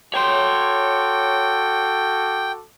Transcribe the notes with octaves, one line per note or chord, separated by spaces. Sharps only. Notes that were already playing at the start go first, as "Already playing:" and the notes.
F#4 A4 C#5 G5 C6 D6